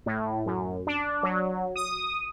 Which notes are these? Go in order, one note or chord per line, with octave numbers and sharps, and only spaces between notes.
A2
F#2
D4
F#3
D#6